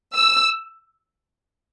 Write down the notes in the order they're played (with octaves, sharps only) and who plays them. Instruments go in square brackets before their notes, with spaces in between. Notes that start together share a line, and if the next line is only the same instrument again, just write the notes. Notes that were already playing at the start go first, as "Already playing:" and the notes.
[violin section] E6